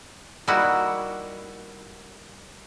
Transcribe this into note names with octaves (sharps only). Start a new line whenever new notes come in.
G3 A#3 D#4 E4 F#4